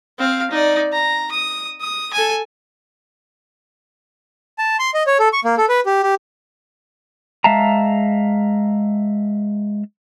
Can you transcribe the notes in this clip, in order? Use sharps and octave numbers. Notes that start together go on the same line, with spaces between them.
C4 F5
D#4 D5
A#5
D#6
D#6
A4 G#5
A5
C6
D#5
C#5
A4
C#6
A#3
A4
B4
G4
G4
G#3 E5 F5 A5 A#5